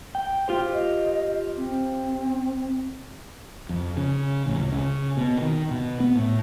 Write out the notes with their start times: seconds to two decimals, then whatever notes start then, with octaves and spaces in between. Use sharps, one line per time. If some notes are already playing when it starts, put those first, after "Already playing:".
0.15 G5
0.48 F4 G4 C5
0.73 D#5
1.57 C4
3.69 F2
3.97 C#3
4.46 A1
4.59 C#2
4.72 C#3
5.17 B2
5.41 D#3
5.71 B2
6.00 B3
6.15 A2